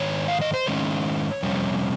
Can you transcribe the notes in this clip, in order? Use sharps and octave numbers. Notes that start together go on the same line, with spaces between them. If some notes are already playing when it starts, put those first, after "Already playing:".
Already playing: G#2 D#3 C#5
F5
D#5
C5
G#2 D#3 G#3 C#4 C#5
F2 C3 G3 C#4